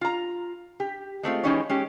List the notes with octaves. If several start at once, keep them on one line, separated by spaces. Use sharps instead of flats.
F4 A#5
G4
G#3 A3 C4 F4
E3 G#3 C#4 D#4 G4 C#5
G#3 C#4 G4